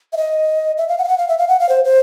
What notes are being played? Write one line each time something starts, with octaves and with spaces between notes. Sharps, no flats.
E5
D#5
E5
F5
F#5
F5
F#5
F5
E5
F5
F#5
F5
C5
C5